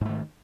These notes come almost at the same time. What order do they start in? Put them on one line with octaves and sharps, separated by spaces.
G#2 A3 D#3